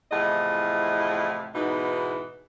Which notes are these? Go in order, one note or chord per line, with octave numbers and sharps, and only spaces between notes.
E2 A2 C3 F3 D#5
G#2 B2 E3 B3 D#4